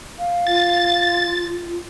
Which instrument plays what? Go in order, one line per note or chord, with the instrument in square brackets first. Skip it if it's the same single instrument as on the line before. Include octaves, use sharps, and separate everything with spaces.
[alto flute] F5
[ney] F4 [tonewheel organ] A6